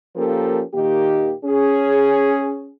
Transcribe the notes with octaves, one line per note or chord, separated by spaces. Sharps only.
F3 A#3 C#4 G4 A4 A#4
A#2 D#3 A#3 D#4 G4
C#4 G#4